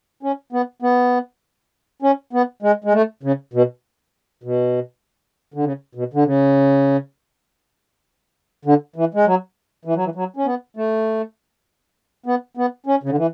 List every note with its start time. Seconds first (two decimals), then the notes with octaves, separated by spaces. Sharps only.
0.23 C#4
0.53 B3
0.82 B3
2.02 C#4
2.33 B3
2.63 G#3
2.84 G#3
2.93 A3
3.23 C#3
3.54 B2
4.44 B2
5.54 D3
5.64 C#3
5.95 B2
6.14 D3
6.25 C#3
8.65 D3
8.96 E3
9.14 G#3
9.26 F#3
9.85 E3
9.95 F#3
10.05 E3
10.15 F#3
10.36 C#4
10.46 B3
10.77 A3
12.26 B3
12.57 B3
12.86 C#4
13.03 C#3
13.09 D3
13.18 E3